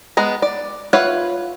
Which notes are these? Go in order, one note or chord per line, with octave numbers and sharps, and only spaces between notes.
G#3 B3 A#5
D5
F4 B4 C#5 E5 F#5